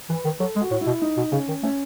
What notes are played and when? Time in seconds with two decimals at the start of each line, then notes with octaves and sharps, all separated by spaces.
0.10 E3 B4
0.25 D#3
0.40 F#3 A4
0.56 G#3
0.61 F#4
0.71 A2
0.81 E4
0.86 B2
1.02 D#4
1.17 B2
1.32 C#3 C#4
1.48 D#3
1.63 A3 C#4